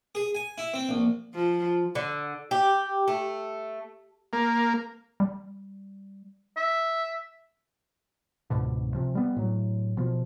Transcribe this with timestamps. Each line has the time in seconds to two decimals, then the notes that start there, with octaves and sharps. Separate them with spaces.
0.15 G#4
0.35 G#5
0.58 E4
0.74 C4
0.89 A#1
1.34 F3
1.95 D3
2.51 G4
3.08 A3
4.33 A#3
5.20 G3
6.57 E5
8.50 C#2 G#2 B2 D3
8.95 C3 F3
9.15 G3 B3
9.37 A2 F#3
9.97 B2 F3